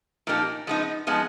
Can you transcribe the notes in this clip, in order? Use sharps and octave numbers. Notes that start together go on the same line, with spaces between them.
A#2 F3 A#3 D#4 G4
F3 G#3 B3 D#4
F3 G#3 B3 D#4